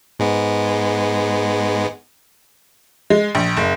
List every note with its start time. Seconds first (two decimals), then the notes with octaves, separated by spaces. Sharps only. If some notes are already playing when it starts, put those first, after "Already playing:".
0.19 G#2 G#3 B3
3.10 G#3
3.35 A#1
3.57 F#1